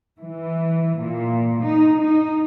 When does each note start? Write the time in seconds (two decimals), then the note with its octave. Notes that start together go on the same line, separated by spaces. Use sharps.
0.19 E3
0.98 A#2
1.63 D#4
1.98 D#4